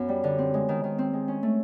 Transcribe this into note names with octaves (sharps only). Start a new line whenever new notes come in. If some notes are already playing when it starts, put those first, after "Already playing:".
Already playing: F#2 B3
G3
D3
C4
G#3
D#3
D#3
C4
G#3
C#4
A3